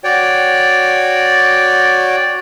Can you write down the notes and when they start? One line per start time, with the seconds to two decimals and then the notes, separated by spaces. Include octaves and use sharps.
0.04 F#4 C#5 D5 G5